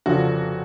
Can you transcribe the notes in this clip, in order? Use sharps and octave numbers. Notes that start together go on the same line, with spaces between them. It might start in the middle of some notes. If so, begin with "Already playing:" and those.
F1 F2 C#3 F3 F#4